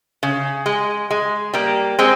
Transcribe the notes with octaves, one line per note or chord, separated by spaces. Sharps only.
C#3
G#3
G#3
G3 A#3
G#3 C4